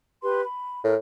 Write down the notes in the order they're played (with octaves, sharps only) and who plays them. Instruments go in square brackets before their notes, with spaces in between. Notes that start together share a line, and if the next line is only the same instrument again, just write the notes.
[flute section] G4 B4 C6
B5
[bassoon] A2 [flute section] A#4